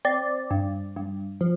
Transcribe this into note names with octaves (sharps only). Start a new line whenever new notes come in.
C4 D5
G2
G2
F3